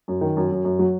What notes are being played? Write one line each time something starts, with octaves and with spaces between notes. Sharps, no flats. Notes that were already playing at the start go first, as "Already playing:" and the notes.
F#2
D#3
F#2
F#2
F#2
F#3